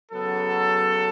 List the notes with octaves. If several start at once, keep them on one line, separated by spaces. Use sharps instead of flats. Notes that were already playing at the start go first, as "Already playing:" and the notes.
C#3 F#3 B3 A4